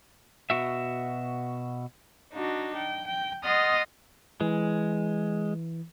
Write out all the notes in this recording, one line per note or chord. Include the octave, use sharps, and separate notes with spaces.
B2 F#4 E5
D4 D#4 F#4
G5
G5
D#5 F#5 C6 D#6 F6 A6
E3 G#3